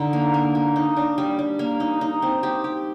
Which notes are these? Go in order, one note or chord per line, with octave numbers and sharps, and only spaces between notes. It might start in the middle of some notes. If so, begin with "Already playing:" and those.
Already playing: D3 D#4
A#3
A#3
A#3
D#4
D4
G3
G3
A#3
D#4
D#4
C4
G4
G4